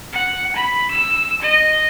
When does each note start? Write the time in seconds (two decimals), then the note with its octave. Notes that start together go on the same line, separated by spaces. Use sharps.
0.13 F#5
0.56 B5
0.91 E6
1.42 D#5